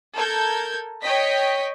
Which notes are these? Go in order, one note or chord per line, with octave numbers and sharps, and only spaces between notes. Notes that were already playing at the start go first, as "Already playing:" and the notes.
A4 A#4 G6 G#6
C#5 D#5 G5 B6